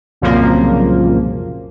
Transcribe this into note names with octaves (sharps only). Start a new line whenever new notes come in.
C2 F#2 A#2 C#3 F3 A#3